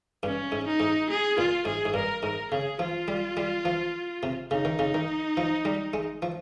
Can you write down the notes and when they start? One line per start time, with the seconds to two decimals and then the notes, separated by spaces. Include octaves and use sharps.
0.23 G2 C#4
0.52 G#2
0.67 D#4
0.80 G#2
1.09 G#4
1.38 A#2 F4
1.65 G#2 G#4
1.85 G#2
1.94 G2 A#4
2.23 G#2 A#4
2.51 C#3 G#4
2.79 F3 F4
3.08 G3
3.37 G3
3.65 F3
4.23 C3
4.51 C#3 D#4
4.65 D#3
4.79 C#3
4.94 D#3
5.37 F3
5.65 G3
5.94 G#3
6.22 F3